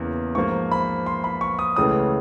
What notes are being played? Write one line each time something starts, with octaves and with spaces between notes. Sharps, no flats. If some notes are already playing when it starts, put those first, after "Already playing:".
Already playing: E2 C#3 E3 A#3
G#2 F3 A#3 C#6
B5
C6
B5
C#6
D#6
C#2 C#3 E3 A3 D#6